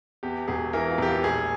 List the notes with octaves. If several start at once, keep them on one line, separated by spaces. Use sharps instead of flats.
E2 G4
E1 G#4
E3 A#4
F4
E1 G4
F4
A#1 G#4